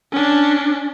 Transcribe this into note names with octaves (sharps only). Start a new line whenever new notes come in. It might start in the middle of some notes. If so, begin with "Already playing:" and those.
C#4 D4